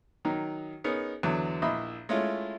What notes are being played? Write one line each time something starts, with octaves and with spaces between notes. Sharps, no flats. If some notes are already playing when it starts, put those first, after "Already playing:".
D#3 F#3 D#4
B3 C#4 D#4 G#4 A#4
E2 D3 F#3
A#1 E4 D#5 E5 B5
G#3 A3 C#4 E4 F4